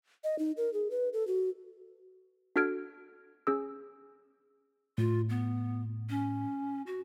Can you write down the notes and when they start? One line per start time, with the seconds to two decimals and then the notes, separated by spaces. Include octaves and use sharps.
0.24 D#5
0.39 D#4
0.57 A#4
0.74 G#4
0.91 B4
1.13 A4
1.27 F#4
2.56 D4 F#4 A4 F6 G#6 D7
3.47 C#4 G#4 E6
4.98 A2 F4
5.29 B3
6.10 C#4
6.87 F#4